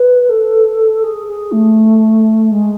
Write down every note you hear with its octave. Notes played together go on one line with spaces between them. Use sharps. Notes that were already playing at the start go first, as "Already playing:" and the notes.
Already playing: B4
A4
G#4
G#4
A3
G#3